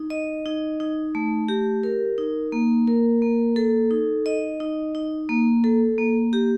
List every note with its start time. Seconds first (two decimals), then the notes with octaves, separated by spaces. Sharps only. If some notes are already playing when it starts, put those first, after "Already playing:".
Already playing: D#4
0.10 D#5
0.46 D#4
0.80 D#4
1.15 A3
1.48 G4
1.83 A#4
2.18 D#4
2.52 A#3
2.88 A#4
3.22 A#3
3.56 A4
3.91 D#4
4.26 D#5
4.60 D#4
4.95 D#4
5.29 A#3
5.64 A4
5.98 A#3
6.33 G4